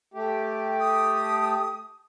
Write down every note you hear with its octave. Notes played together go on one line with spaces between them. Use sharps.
A3 G4
D#6